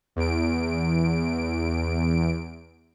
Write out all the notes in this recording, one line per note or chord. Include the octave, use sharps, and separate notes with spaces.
E2 D7